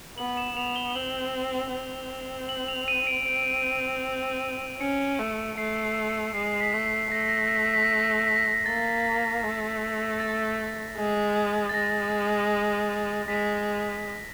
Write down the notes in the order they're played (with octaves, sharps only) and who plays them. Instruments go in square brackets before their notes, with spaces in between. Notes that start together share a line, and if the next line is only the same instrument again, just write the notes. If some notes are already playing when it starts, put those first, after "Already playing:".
[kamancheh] B3 [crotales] F#7
[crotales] E7
[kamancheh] B3 [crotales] F7
[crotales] G7
G7
[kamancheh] C4 [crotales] F#7
[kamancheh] C4
[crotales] F#7
F7
D#7
D7
[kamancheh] C4 [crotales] D7
[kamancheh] C#4 [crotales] C#7
[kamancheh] A3
[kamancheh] A3 [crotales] C7
[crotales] C7
C#7
[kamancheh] G#3 [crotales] C7
[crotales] C7
B6
[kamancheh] A3
[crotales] C7
[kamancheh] A3 [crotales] A#6
[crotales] B6
A#6
B6
A#6
B6
A#6
B6
A#6
B6
A#6
B6
A#6
B6
A#6
B6
A#6
[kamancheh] A#3 [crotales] A6
[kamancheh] A3
[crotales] A6
[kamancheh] G#3
[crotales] A6
[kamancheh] G#3 [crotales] A#6
[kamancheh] G#3 [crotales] B6